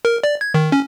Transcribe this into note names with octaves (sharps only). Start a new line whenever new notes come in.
A#4
D5
G#6
D#3
C#4